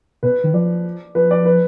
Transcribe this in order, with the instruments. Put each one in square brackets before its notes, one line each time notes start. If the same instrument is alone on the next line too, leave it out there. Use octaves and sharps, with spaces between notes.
[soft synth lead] B2 [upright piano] B4
[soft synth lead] D#3
[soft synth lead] F3 [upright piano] D5
[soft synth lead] F3 [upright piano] B4
[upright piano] D5
B4